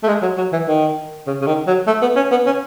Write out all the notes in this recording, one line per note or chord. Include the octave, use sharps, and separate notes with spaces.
A3
G#3
F#3
F#3
E3
D#3
C#3
C#3
D#3
F#3
A3
B3
C#4
B3
C#4